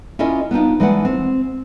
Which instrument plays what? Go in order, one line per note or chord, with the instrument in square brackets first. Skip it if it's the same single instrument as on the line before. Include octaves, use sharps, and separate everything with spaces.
[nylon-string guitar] C#4 E4 F4 G#4 A#4 D#5
B3 D4 D#4 F4
E3 G#3 D4 B4 F#5
C4